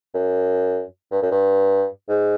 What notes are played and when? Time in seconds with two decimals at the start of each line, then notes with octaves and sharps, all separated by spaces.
0.14 F#2
1.11 G2
1.22 F#2
1.31 G2
2.09 G#2